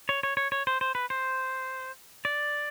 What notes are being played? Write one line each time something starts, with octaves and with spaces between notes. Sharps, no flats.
C#5
C#5
C#5
C#5
C5
C5
B4
C5
D5